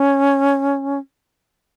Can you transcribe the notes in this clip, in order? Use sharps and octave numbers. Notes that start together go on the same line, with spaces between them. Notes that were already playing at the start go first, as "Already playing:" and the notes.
Already playing: C#4